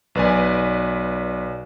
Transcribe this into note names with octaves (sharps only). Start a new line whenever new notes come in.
B1 B4 D5 G#5